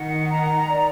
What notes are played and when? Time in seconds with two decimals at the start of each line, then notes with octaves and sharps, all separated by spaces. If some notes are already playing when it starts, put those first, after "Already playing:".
Already playing: D#3 F#5
0.30 A#5
0.70 D5